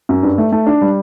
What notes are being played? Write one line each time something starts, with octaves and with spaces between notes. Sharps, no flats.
F#2
G2
A3
A3
D4
G3